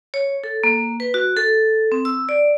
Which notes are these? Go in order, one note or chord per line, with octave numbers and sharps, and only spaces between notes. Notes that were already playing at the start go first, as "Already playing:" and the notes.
C#5
A4
A#3
B4
F#4
A4
C4
E6
D5